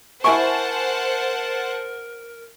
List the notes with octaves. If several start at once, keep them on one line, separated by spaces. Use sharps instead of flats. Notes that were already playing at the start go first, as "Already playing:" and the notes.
E4 A#4 C5 F#5 G#5 A5 C#6